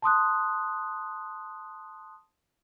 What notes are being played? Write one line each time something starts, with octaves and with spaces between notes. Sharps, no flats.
A5 C6 D#6 F#6